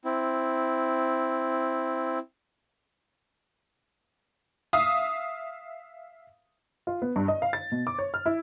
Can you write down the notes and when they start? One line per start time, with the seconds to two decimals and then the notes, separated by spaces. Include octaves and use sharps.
0.05 C4 E4
4.73 E5 F5 D#6
6.87 F4
7.02 B3
7.16 G2
7.28 D#5
7.42 F5
7.53 A6
7.72 B2
7.87 D6
7.98 C#5
8.14 F6
8.26 E4